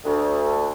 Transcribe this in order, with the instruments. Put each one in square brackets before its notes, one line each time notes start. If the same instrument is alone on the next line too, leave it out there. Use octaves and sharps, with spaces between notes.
[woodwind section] D2